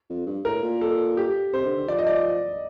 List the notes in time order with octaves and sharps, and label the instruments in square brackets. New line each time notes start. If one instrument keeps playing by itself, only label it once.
[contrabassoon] F2
G2
[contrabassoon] A2 [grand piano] A#4
[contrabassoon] A#2
[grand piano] A4
G4
[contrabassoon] C3 [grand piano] C5
[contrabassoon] D3
D3
[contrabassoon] F3 [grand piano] D5
[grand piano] D#5
D5